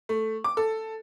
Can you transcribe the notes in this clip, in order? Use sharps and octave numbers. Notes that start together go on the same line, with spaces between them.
A3
D6
A4